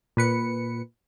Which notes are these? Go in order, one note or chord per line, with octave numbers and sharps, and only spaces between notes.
A#2 B4 C#7